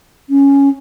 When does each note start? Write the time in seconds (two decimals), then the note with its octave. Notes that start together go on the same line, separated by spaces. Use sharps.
0.30 C#4